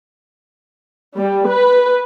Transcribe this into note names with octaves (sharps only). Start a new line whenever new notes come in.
G3
B4